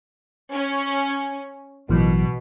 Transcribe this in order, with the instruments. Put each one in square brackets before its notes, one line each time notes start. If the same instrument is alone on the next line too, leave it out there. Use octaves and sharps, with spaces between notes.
[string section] C#4
[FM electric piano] A1 E3 F#3 [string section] B2